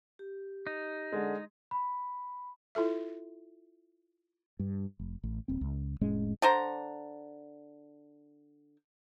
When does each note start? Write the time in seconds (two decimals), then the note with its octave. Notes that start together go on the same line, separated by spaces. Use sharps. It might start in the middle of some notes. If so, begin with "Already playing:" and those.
0.19 G4
0.67 D#4
1.13 D3 G#3
1.71 B5
2.75 E4 F4 A4 E5
4.59 G2
4.99 F1
5.23 A1
5.48 D#1 C4
5.61 C#2
6.01 F1 A2 G#3 C#4
6.42 D3 C5 A#5